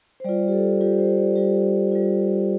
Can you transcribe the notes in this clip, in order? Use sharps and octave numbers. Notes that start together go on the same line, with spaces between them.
C5
G3 F4 D5
G4
A4
G3 F4 G4
C5
D5
G3 F4 G4
G3 F4